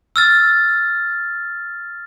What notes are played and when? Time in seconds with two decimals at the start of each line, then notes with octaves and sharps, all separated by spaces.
0.16 E6 F6 A6